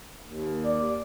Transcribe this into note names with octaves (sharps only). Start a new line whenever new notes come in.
D#2
D5